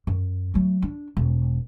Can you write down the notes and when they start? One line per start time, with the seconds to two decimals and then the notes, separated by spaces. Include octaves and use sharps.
0.07 F#2
0.54 F#3 A3
0.82 D4
1.17 E1